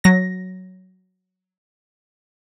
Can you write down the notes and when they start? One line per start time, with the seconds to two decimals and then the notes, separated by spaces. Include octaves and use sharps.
0.04 F#3 A#6